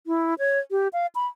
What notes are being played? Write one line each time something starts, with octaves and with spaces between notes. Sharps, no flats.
E4
C#5
G4
F5
B5